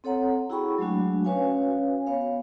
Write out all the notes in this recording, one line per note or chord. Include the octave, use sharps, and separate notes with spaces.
C4 A4 C#5 F#5 A#5
E4 F#4 G#4 G5 B5 C#6
F#3 G#3 A3 D4 F#4
C#4 F#4 B4 C#5 F5 G#5
B3 C#5 F5